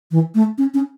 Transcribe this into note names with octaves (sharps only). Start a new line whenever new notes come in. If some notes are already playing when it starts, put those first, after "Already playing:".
E3
A3
C#4
C#4